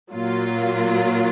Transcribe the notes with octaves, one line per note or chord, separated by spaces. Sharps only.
A#2 F#3 A#3 F4